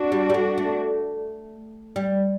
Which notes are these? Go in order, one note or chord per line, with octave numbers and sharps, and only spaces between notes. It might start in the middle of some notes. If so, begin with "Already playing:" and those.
Already playing: D4 F#4
G3
G3
A3
A3
G3